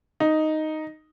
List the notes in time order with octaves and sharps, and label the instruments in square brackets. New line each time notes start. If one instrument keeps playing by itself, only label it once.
[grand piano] D#4